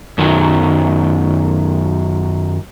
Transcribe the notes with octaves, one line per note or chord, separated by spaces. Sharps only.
F#2 D#3 F#3